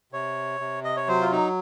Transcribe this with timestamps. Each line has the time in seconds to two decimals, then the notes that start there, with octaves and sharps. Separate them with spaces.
0.12 C3 C#5
0.60 C3
0.84 D#5
0.97 C#5
1.08 F#3 C5
1.21 F4
1.32 D#4